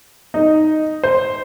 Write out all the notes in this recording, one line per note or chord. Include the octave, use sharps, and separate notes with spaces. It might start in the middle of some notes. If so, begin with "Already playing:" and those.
D#4
C5